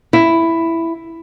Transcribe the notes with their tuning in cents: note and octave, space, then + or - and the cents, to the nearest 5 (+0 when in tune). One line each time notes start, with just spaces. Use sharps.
E4 +5